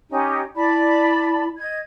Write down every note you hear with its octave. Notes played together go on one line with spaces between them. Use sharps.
C#4 D#4 G4
E4 D5 A5 B5
D#5 G#6